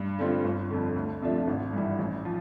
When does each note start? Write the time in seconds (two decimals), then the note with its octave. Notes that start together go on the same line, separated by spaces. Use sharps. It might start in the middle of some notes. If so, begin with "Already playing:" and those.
Already playing: G2
0.19 D3 G3 C4 F4
0.44 G1
0.70 F2 D3
0.96 D2
1.22 C3 F3 A3 D4
1.47 G#1
1.73 G2 E3 G3
1.99 A1
2.25 F3